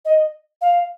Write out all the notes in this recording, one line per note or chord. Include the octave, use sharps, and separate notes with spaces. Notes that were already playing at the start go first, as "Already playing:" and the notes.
D#5
F5